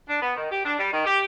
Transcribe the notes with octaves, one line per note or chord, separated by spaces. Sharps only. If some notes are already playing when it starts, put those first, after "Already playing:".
D4
B3
D#3
G4
D4
G3
D#3
G4